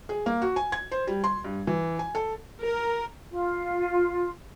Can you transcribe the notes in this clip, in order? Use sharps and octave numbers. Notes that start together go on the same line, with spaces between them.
G#4
A#3
F#4
G#5
G#6
C5
G3
C6
G2
E3
G#5
A4
A#4
F4